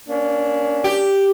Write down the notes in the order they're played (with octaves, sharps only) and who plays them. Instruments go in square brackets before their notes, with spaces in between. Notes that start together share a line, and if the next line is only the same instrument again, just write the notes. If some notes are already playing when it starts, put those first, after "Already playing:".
[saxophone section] A#3 C#4 D4
[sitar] G4